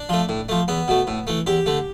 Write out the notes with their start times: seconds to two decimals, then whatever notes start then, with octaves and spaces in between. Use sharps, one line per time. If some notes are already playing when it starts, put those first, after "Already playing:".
Already playing: D4
0.09 F3 A3
0.29 A2
0.49 F3 A3
0.68 E2 B3
0.88 B2 A3
1.07 A2
1.27 E3 A3
1.47 E2 G4
1.66 D3 A3